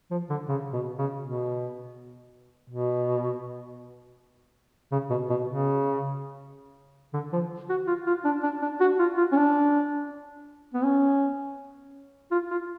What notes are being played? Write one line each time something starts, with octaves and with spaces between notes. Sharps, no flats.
F3
D3
C#3
B2
C#3
B2
B2
C#3
B2
B2
C#3
D3
F3
F#4
F4
F4
D4
D4
D4
F#4
F4
F4
C#4
D4
B3
C#4
F4
F4